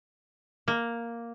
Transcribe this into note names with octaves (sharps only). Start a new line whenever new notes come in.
A#3